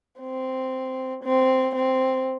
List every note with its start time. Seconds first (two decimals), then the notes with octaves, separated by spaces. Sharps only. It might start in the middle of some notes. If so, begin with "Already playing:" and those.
0.20 C4
1.23 C4
1.75 C4